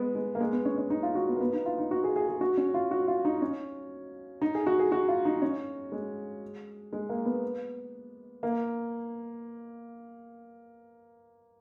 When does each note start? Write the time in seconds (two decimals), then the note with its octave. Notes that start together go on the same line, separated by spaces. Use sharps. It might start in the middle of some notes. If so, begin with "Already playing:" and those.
Already playing: G#3 B3
0.15 G#3
0.35 A#3
0.40 G#3
0.52 B3
0.65 C#4
0.78 C#4
0.90 D#4
1.03 F4
1.15 F#4
1.28 B3
1.36 A#3
1.40 B3
1.53 D#4
1.66 F4
1.78 D#4
1.91 F#4
2.04 G#4
2.16 G#4
2.28 G#4
2.41 F#4
2.57 C#4
2.74 F4
2.91 F#4
3.08 F4
3.25 D#4
3.42 C#4
4.42 D#4
4.55 G#4
4.66 F#4
4.79 G#4
4.92 F#4
5.08 F4
5.25 D#4
5.42 C#4
5.92 G#3
6.93 G#3
7.09 A#3
7.25 B3
8.43 A#3